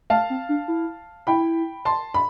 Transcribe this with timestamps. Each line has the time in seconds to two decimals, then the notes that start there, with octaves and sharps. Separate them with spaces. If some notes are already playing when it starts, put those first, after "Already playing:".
0.10 A3 F5 A5
0.30 C4
0.49 D4
0.68 E4
1.27 E4 G5 B5
1.85 A5 C6
2.14 B5